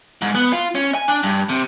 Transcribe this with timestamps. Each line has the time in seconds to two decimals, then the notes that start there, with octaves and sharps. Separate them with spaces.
0.22 G#2
0.35 B3
0.53 F4
0.75 C#4
0.95 G#5
1.08 D4
1.23 G2
1.49 C3